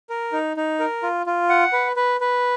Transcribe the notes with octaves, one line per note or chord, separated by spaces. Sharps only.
A#4
D#4
D#4
A#4
F4
F4
F#5
B4
B4
B4